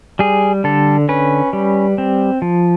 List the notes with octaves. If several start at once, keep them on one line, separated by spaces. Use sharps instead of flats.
G3 G#4
D3 A4
C#4 B4
G3
C4
F3